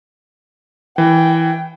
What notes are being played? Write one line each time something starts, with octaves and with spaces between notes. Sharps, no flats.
E3 G5